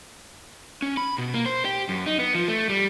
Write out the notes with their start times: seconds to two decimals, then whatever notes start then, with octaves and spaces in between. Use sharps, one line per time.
0.82 C#4
0.97 B5
1.18 B2
1.34 A#3
1.46 C5
1.65 G4
1.89 F#2
2.06 D#4
2.19 B3
2.35 F3
2.48 A3
2.69 G3